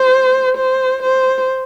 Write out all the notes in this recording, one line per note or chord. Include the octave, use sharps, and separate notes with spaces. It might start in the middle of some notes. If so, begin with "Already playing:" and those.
Already playing: C5
C5
C5